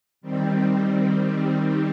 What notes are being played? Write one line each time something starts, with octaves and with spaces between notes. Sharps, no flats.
D#3 G3 C4